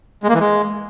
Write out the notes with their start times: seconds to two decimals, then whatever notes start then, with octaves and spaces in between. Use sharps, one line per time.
0.23 G#3
0.29 A#3
0.35 E3
0.40 G#3